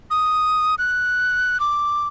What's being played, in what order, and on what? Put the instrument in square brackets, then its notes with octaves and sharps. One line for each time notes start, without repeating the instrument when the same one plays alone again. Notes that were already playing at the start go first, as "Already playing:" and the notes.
[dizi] D#6
F#6
D6